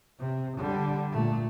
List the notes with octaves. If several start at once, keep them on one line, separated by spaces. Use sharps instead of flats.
C3
D3 G3
A#2 A3